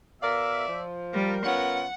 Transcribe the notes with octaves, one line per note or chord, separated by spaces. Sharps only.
B2 A#4 D5 E5 F5
F3
G3 A#4
B3 C#4 F4 F#5